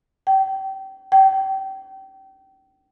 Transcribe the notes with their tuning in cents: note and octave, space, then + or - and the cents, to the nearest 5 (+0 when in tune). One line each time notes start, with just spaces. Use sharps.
G5 -30
G5 -30